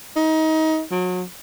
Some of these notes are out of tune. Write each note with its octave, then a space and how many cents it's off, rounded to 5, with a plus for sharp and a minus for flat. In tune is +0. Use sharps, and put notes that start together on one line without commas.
D#4 +25
F#3 -30